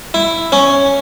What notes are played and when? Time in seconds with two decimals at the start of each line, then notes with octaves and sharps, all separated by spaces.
0.14 E4
0.52 C#4